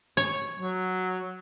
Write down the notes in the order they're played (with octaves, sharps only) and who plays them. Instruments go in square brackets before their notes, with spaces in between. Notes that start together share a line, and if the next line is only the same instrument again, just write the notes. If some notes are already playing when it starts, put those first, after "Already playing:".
[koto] C#5
[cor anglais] F#3